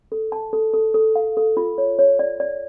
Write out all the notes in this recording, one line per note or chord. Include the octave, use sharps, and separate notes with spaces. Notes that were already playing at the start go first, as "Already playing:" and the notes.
A4
A5
A4
A4
A4
F5
A4
F4
C#5
C#5
D5
D5